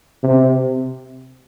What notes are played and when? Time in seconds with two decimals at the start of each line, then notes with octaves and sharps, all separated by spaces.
0.23 C3